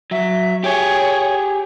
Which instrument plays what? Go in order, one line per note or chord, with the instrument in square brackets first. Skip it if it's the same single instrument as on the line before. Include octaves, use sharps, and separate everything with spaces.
[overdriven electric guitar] F#3 [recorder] E5
[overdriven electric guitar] G4 G#4 [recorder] C#5